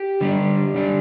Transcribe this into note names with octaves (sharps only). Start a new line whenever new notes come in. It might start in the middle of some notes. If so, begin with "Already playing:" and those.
Already playing: G4
D3 G3 D4
D3 G3 D4